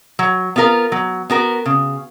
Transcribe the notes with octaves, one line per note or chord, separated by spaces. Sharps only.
F#3
B3 F4 A#4
F#3
B3 F#4 A#4
C#3